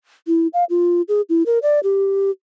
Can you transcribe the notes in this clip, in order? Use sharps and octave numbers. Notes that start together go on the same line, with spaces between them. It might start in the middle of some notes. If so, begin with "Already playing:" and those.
E4
F5
F4
G#4
E4
A#4
D5
G4